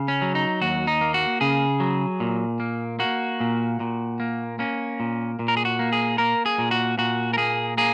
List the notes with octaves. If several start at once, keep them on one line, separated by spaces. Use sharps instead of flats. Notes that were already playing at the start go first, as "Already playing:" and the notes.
Already playing: C#3
C#4
F#3
D#4
D#2 F#4
D#4
A#3
F#4
C#3 G#4
F#3
A#2
A#3
A#3 F#4
A#2
A#2
A#3
A#3 C#4
A#2
A#2
A#4
G#4
F#4
A#3
G#4
A#3 A#4
G#4
A#2
F#4
A#2 F#4
A#4
A#3 G#4
A#3 G#4